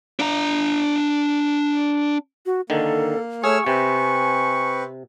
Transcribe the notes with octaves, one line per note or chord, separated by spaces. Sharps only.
D4 A#5
F#4
D3 D#3 A#3 A4
A3 G#4 C#5 C#6 E6 F6
C3 C4 B4 G#5